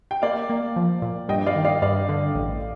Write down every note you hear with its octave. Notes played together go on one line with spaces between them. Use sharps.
G5
A#3 D5 F5
A#3
F3
A#2
G2 D#5 G5
D5 F5
D#3
D5 F5
G2 D5 F5
D3
A1